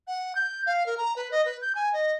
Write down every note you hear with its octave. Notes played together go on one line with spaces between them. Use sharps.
F#5
G6
F5
A#4
A#5
B4
D#5
B4
G6
G#5
D#5